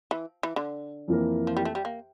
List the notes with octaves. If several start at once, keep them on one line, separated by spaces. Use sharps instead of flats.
E3
E3
D3
F2 E3 A#3 E4 A#4
F3
G3
A3
G3
A#3